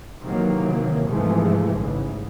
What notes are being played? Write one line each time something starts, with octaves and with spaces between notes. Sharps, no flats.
C3 D#3 E3 F#3 A#3
G#2 C3 E3 F3 G#3 A3
A1 G#2 C#3 E3